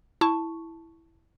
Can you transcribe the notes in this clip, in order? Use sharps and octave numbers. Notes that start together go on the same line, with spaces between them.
E4 A5 C#6